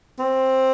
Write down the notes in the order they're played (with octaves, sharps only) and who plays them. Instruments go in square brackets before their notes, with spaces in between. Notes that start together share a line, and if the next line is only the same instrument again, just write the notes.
[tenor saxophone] C4